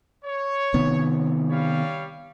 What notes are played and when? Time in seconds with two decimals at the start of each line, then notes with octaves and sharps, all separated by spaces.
0.24 C#5
0.74 C3 D#3 B3
1.49 G3 C#5 F5